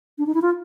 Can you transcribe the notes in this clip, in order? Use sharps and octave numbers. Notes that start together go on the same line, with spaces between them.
D4
D#4
E4
F4